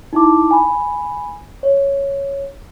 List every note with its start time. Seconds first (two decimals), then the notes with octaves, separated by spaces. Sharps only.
0.13 D#4 E4 A5 D6
0.51 G#5 B5
1.63 C#5